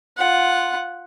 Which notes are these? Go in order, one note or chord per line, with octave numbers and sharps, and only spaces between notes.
F4 F#5